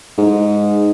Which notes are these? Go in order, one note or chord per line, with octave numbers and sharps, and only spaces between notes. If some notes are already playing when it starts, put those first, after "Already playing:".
G#2